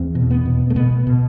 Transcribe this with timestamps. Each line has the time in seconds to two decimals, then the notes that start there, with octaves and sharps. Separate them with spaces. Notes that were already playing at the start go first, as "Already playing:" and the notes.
Already playing: E2 C4
0.15 B2
0.31 B3
0.45 B2
0.70 A3
0.76 B2 B3
1.07 B2